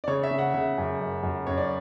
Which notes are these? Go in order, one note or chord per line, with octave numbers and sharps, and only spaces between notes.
D5
C#3 C#5
E5
C#3
F#5
C#3 E5
F#2
F#2
F#2
F#2 C#5
D5